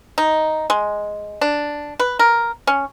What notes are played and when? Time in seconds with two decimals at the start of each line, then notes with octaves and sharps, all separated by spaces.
0.18 D#4
0.70 G#3
1.41 D4
2.00 B4
2.19 A#4
2.67 C#4